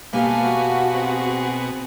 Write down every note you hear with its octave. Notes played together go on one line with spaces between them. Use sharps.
B2 A3 A#3 G4 F5 G#5
F#4
C4 G#4